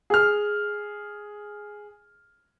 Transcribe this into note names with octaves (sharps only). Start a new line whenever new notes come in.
G#4 F6